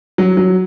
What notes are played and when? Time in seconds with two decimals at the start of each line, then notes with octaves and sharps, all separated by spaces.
0.18 F#3
0.37 F#3